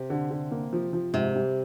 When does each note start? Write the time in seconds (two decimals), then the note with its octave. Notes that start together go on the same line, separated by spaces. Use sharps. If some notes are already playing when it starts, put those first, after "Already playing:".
Already playing: C3
0.10 D3
0.31 D3
0.51 A#3
0.73 F3
0.93 F3
1.14 G#2 C3
1.35 G3